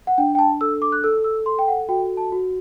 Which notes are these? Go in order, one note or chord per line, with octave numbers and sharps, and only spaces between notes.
F#5
D4 G5
G5
A5
A4 E6
D6
F#6
A4 E6
E6
A4 C6
G5
F#5
F#4 G5
A5
F#4